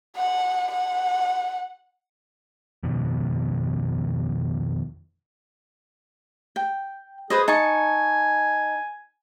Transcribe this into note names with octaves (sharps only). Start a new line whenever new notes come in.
F#5
F#5
F2 B2 D#3
G5
G#4 B4 C5 D#5
D#4 G#5 A5 C#6